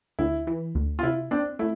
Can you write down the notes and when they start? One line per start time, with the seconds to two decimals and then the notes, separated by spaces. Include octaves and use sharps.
0.19 D2 E4
0.47 E3
0.75 D2
0.99 F4
1.03 C3 E4
1.31 C4 D4
1.59 A3 E4